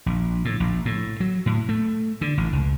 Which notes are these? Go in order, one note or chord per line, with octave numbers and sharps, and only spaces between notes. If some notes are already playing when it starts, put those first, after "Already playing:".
A#1
A2
A#1
A2
F#3
A2
A3
D3
A1
C#2